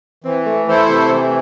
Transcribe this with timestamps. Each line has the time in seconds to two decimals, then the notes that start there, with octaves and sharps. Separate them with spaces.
0.24 E3 C4
0.46 A3
0.68 E3 A3 E4 A4 C5
0.89 C3
1.10 E3